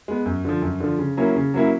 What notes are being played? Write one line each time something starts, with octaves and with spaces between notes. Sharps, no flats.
G#3 B3
F#2
D3 F3
F#2
D3 F3
C#3
F#3 A#3 C#4 E4
C#3
F#3 A#3 C#4 E4